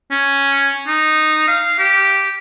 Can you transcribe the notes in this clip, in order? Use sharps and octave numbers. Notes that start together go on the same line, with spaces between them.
C#4
D#4
F5
G4